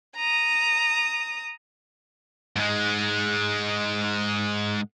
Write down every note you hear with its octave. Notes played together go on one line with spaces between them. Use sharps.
A#5 D#6
G#2 G#3